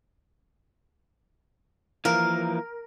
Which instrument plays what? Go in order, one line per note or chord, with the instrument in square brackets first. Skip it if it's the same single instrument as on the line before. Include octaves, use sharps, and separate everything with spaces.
[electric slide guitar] E3 F3 A#3 [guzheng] A#4